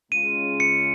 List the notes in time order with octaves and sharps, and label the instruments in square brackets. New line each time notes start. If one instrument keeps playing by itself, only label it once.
[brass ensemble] C#3 G#3 C#4 F4 [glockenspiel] D#7
[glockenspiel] C#7